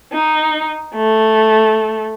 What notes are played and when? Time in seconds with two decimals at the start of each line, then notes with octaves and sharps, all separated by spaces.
0.13 D#4
0.95 A3